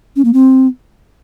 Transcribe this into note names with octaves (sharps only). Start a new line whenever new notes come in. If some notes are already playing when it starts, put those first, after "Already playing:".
C#4
A#3
C4